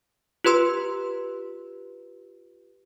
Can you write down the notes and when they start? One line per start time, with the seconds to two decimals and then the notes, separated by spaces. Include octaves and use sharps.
0.44 F4 G4 B4 C6 E6